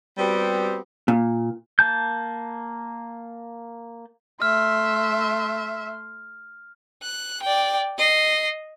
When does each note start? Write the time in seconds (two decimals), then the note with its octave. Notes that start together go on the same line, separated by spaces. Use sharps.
0.18 G3 B3 C4 F#4 G4
1.08 A#2
1.79 A#3 A5 G6
4.42 A3 E5 C6 F6
7.03 F#6
7.43 D5 G5
7.98 D#5 C7